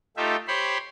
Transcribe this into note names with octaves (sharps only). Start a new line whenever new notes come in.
A3 D#4 F4 G4 E5
G4 C5 C#5 B5 C6